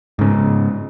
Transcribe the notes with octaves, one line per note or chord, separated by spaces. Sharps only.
G#2 C#3